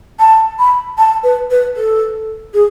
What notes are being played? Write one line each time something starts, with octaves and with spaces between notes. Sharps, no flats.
A5
B5
A5
B4
B4
A4
G#4